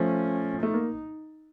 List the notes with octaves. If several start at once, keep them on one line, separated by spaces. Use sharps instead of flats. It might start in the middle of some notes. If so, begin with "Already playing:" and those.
Already playing: F3 A3 C#4
A3 D#4
A#3